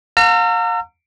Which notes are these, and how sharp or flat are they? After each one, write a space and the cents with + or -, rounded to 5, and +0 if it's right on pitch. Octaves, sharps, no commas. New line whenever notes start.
F5 +40 A#5 -35 E6 +40